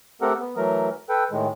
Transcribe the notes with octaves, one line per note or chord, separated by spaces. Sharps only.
A3 C4 G4 A4 A#4 F#5
B3
E3 F#3 A3 A#4
A4 B4 G5
A2 D#3 G#3